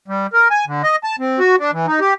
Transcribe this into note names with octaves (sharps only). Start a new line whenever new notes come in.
G3
A#4
G#5
D3
D#5
A5
C4
F#4
D4
E3
D#4
G4